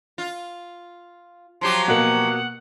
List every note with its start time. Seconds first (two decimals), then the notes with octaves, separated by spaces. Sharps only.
0.18 F4
1.61 F3 F#3 G4 C6
1.88 B2 A#3 F#5